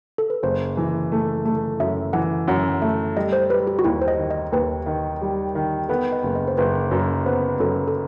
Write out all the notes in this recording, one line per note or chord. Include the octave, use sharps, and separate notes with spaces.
A4
B4
F#1 C5
E3
A3
A3
F#2 E5
E3 F#5
F#2 F#5
A3 E5
G3 D#5
C5
G3 B4
G4
F#4
D#2 E4
C5
D#5
D#3
D#5
D#2 B4
D#3
G3
D#3
B3 A4
D#5
F#1
D#5
C5
F#1 B4
F#2 B4
B3 C5
F#2 A4
A4